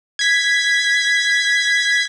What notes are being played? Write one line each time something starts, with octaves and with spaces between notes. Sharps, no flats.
G#6 B6